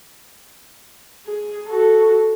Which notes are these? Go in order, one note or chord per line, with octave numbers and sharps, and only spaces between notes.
G#4
F#4 A4